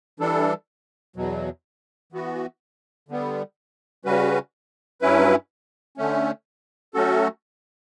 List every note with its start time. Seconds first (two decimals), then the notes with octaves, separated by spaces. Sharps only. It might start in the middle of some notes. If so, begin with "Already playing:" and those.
0.20 E3 G3 D4 A4
1.16 E2 B2 F#3
2.13 E3 B3 F#4
3.09 D3 G3 B3
4.05 C#3 G3 C#4 F#4 B4
5.01 G2 F#3 C#4 E4 B4
5.97 D3 A3 C#4
6.94 F#3 A3 C#4 F#4 A4